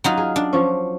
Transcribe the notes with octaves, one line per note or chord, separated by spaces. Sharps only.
F#3 D#4 F4
G#4
D4
F3 C#4